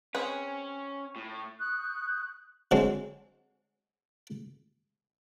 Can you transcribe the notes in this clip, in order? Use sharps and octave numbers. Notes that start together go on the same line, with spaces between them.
C4 C#4 G#4 B4
A2
C#6 D#6 F#6 G6
D3 F#3 G#3 C4